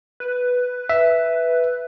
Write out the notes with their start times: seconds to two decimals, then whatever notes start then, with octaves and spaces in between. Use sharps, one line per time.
0.20 B4
0.89 E5